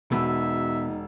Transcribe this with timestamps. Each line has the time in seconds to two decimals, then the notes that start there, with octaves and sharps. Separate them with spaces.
0.12 E1 B2 D#4 E5 E6